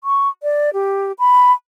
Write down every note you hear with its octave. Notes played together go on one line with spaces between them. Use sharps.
C#6
D5
G4
B5